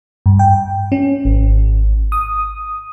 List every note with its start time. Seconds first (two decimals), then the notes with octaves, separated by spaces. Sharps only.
0.26 G2
0.39 G5
0.92 C#4
1.25 G#1
2.12 D#6